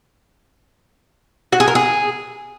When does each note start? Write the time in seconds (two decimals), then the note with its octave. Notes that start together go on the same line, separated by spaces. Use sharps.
1.52 F#4
1.60 G#4
1.68 A#4
1.75 G#4